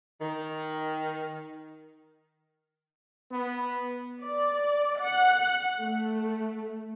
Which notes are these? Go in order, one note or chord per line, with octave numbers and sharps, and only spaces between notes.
D#3
B3
D5
F#5
A3